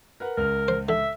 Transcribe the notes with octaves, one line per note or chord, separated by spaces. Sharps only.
A#4 B4 F#5
C#2 A#4 F6
C5
D3 E5